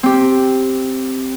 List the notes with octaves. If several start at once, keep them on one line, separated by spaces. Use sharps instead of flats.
C4 G4